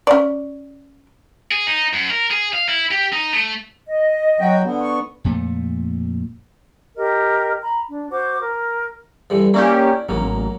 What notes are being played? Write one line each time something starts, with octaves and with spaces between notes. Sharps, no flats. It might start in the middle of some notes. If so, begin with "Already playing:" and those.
C#4 D5
G#4
D#4
F#2
A#4
G#4
F5
E4
G4
D#4
A3
D#5
F#3 F#4 G5
D3 B3
C#6
F2 A#2 A3
G4 A#4 D#5
A#5 B5
D4
F#4 C5 D6
A#4
G2 D3 E3
A#3 C#4 D4 E4 G4
A1 F#3 A#3